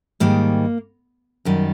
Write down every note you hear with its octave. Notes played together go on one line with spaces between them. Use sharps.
G#2 D#3 G3 A#3
F#2 D#3 G3